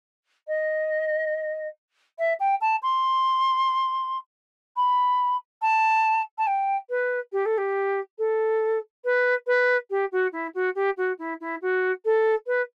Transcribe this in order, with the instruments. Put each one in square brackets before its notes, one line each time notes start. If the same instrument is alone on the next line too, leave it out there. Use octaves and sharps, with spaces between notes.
[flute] D#5
E5
G5
A5
C6
B5
A5
A5
G5
B4
G4
A4
G4
A4
B4
B4
G4
F#4
E4
F#4
G4
F#4
E4
E4
F#4
A4
B4